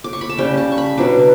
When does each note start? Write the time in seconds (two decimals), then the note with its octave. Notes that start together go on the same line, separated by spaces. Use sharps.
0.04 D6
0.13 C#6
0.21 B5
0.29 A5
0.38 C#3 G3 C#4 G5
0.57 A5
0.72 C#6
0.78 B5
0.98 B2 F#3 B3 D4 D6